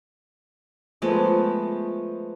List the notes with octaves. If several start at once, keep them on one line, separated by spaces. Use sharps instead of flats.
F3 G#3 A3 B3